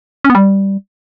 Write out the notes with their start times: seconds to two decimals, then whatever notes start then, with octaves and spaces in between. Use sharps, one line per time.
0.25 C#4
0.30 B3
0.35 G3